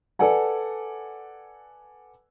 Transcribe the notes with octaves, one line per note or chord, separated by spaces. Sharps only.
A4 B4 D5 F#5 G#5